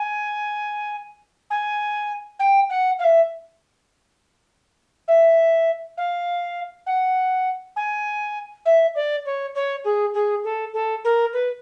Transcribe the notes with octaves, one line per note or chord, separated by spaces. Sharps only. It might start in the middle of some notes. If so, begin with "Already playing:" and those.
Already playing: G#5
G#5
G5
F#5
F5
E5
E5
F5
F#5
G#5
E5
D5
C#5
C#5
G#4
G#4
A4
A4
A#4
B4